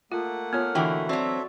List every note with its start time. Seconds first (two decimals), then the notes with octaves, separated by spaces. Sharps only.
0.12 A3 A#3 F4 F#5
0.53 B3 F4 C#5 F6
0.75 B2 D3 E3 F#4 E5 G5
1.09 F#3 C4 F#4 A4 D5 E5